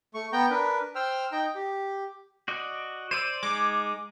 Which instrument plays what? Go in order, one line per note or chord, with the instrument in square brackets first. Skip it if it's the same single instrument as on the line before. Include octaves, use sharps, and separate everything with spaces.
[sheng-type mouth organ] A3 C#6
B3 G5 A#5 G6
D4 A#4 B4
C5 G5 E6 F6
D#4 G5 A#5
G4
[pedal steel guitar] F#4 D5 D#5
[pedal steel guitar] C5 D5 E6 [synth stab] D#7
[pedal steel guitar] G#3 D#4 G#4 [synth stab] D6